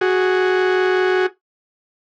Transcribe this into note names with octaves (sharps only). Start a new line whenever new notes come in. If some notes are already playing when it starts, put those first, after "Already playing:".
F#4 G#4